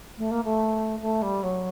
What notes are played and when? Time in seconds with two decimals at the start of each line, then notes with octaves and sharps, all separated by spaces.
0.18 A3
0.31 A#3
0.44 A3
1.01 A3
1.22 G3
1.43 F#3